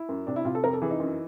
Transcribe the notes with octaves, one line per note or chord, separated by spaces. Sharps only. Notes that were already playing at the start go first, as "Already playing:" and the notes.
Already playing: E4
F#2
C3 D4
E4
C3 F4
A4
F2 A#4
A4
E3 G#4
D#4
F#2